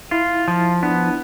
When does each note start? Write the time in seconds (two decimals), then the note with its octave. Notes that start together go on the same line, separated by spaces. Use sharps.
0.11 E4 F4
0.48 F3
0.83 B3 D4